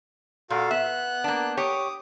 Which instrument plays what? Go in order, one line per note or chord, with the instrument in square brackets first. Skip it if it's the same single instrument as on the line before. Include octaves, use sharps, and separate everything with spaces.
[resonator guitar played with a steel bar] A#2 [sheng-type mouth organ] F#4 A4 F5
[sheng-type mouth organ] B3 F#6 [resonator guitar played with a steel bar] E5
[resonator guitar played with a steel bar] A#3 D4
[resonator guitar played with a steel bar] G4 C#5 [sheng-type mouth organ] D6 D#6